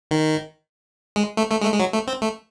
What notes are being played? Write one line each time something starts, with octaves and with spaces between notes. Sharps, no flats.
D#3
G#3
A3
A3
G#3
A3
G#3
F#3
A3
C4
A3